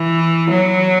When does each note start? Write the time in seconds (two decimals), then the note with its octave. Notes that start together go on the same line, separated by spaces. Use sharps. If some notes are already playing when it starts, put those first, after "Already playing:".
Already playing: E3
0.51 F#3